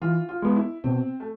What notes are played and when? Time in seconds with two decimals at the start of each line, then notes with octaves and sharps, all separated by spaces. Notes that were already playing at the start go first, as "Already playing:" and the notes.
0.01 E3 F4
0.29 F4
0.42 G#3 B3
0.56 E4
0.84 B2 C4
1.20 A3